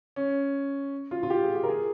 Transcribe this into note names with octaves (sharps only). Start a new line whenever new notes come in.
C#4
F4
F4
G4
G#4
G4
A#4
G#4